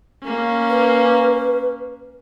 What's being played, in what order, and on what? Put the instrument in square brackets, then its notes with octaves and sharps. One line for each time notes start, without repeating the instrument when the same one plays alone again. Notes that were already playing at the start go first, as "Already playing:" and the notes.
[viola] A#3 C#4
[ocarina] B4